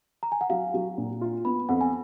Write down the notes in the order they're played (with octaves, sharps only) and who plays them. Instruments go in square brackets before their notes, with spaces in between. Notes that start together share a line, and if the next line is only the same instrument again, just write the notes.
[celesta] A#5
G#5
F#5
[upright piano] F#3 [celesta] F5
[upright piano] F#3
A#2
F4
[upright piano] B3 [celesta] B5
[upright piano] F2 [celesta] F#5
[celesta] G#5